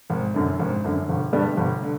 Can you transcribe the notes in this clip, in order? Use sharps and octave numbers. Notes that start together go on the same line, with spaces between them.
G#1
F#2 D3
G#1
F#2 D3
G1
G2 D3 G3 B3
G1
D3